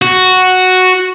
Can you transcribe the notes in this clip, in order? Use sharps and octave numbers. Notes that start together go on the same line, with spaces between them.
F#4